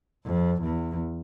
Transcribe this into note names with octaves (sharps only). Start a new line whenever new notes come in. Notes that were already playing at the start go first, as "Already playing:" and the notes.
F2
E2